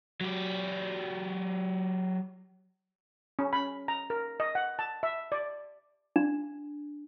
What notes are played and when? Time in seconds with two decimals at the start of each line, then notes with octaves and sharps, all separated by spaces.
0.21 F#3 G4
3.39 C#4
3.53 B5
3.88 A#5
4.10 A#4
4.40 D#5
4.55 F#5
4.79 A5
5.03 E5
5.32 D5
6.16 D4